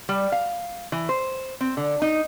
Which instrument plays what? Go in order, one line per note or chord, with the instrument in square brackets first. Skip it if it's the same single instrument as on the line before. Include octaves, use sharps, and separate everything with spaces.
[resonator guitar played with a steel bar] G3
F5
E3
C5
C4
D3
D#4